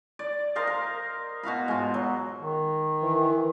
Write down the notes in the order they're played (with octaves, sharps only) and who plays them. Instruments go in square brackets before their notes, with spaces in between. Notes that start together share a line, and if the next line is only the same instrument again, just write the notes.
[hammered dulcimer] D5
A#4 C5 D#5 F5
A#4
B2 F#4 F5 B5
G#2 F4
F#3
[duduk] D#3
[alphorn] E3